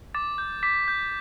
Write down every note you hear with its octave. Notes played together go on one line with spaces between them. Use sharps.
D6 A6
G6
D6 B6
G6